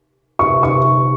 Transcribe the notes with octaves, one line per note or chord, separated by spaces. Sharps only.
C#6
C#6